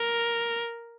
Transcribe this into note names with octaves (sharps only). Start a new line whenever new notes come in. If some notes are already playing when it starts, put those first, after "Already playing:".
Already playing: A#4